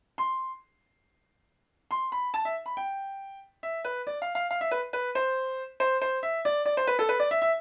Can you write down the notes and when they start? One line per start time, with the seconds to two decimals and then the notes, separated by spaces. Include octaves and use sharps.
0.18 C6
1.91 C6
2.12 B5
2.34 A5
2.45 E5
2.66 B5
2.77 G5
3.63 E5
3.84 B4
4.07 D5
4.22 F5
4.35 F5
4.51 F5
4.61 E5
4.71 B4
4.93 B4
5.15 C5
5.80 C5
6.02 C5
6.23 E5
6.45 D5
6.66 D5
6.77 C5
6.87 B4
6.99 A4
7.09 B4
7.20 D5
7.31 E5
7.42 E5